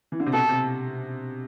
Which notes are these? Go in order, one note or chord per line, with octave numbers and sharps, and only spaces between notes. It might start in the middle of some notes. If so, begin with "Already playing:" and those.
E3
D3
C3
B2 A4
C3